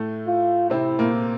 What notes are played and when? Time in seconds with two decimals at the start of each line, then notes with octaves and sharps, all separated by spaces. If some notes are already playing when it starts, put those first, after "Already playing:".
Already playing: A2 A3
0.27 F4
0.70 C3 C4 E4
0.99 A#2 A#3